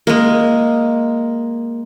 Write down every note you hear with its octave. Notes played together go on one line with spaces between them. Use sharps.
G#3 A#3